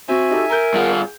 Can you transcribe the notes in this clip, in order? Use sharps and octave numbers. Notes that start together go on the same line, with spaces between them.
C4 F#4 E5 G#5
D#4 G4 A4
A#4 A#5 G6
G2 F4 G#4 F#5